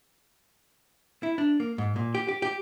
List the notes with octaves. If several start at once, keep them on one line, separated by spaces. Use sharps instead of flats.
E4
D4
A#3
G#2
A#2
G4
G4
G4